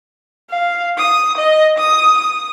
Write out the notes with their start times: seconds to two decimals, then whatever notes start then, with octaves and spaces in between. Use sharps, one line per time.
0.50 F5
0.98 D#6
1.37 D#5
1.78 D#6
2.18 D#6